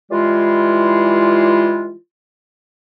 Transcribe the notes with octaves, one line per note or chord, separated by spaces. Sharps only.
E3 G3 G#3 E4 F4